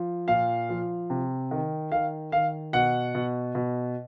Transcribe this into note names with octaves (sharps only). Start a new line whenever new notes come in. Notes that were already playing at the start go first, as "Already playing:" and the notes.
Already playing: F3
A#2 F5
F3
C3
D#3
D#3 F5
D#3 F5
B2 F#5
B2
B2